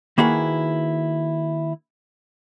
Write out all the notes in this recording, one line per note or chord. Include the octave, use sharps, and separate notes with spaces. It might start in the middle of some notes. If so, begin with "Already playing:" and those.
D#3 A#3 E4 F#4 G#4 B4